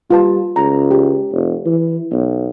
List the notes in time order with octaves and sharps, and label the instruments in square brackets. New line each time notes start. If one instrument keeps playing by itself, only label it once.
[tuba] G3 [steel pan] F4 B4 A5
[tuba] C#2 [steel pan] A#5
[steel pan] G4
[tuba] F1
E3
B1